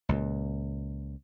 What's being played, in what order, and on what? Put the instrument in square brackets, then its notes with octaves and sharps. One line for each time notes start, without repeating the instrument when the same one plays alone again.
[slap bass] C#2 A#2